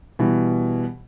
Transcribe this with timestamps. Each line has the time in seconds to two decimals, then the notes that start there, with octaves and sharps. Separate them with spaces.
0.19 B2 E3 G3